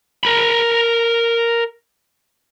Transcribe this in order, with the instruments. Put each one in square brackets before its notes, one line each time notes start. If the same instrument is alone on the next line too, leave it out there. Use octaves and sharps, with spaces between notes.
[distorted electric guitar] A#4 B5